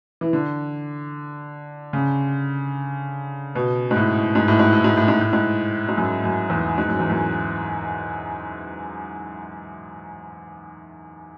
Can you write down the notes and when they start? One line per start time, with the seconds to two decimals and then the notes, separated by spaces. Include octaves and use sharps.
0.21 E3
0.33 D3
1.93 C#3
3.55 B2
3.91 G#2
3.96 A2
4.35 G#2
4.48 A2
4.59 G#2
4.73 A2
4.84 G#2
4.97 A2
5.08 G#2
5.21 A2
5.33 G#2
5.88 G#2
5.97 F#2
6.24 F#2
6.50 E2
6.78 G#2
6.88 F#2
6.99 E2
7.10 F#2